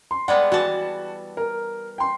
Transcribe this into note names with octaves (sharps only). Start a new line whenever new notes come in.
C6
G3 G#3 B3 F#5
E3 F#4 A5
A#4
G5 C6